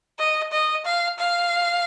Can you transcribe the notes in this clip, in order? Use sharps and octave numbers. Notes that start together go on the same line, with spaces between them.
D#5
D#5
F5
F5